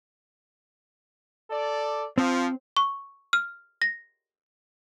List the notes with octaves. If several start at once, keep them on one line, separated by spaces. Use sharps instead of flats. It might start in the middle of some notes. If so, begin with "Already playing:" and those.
A4 D5
F3 C4
C#6
F6
A#6